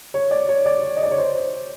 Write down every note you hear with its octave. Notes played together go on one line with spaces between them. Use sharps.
C#5
D5
C#5
D5
D#5
D5
C#5
C5